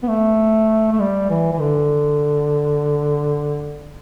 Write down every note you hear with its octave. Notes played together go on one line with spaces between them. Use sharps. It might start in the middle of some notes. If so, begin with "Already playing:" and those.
B3
A3
A3
G3
E3
E3
D3